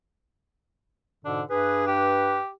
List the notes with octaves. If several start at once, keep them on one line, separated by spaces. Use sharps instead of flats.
G#2 B2 D3 D4
G2 D4 G#4 B4
G4